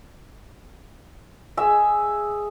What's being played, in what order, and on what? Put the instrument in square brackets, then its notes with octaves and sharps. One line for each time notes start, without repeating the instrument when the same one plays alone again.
[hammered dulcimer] G#4 E5